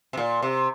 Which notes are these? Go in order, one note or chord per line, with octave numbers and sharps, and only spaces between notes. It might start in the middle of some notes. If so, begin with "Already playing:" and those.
C3
A#2
C3